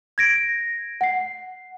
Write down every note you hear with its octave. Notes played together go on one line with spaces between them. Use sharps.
G#6 A#6 D7
F#5 C7